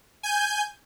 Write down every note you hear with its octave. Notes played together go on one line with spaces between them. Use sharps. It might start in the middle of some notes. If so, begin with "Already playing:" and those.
G#5 G6